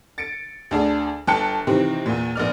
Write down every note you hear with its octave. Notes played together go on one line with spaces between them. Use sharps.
A6 C#7 D7
D2 D4 G#4
G1 G5 A5 F#6 C#7
C3 D#3 E3 C4
E2 A#2
A#1 B3 D5 F6